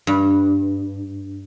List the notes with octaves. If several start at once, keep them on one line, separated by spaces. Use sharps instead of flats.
G2